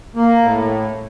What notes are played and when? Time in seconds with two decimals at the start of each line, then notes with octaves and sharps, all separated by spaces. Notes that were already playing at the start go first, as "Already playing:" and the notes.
0.16 A#3
0.42 A2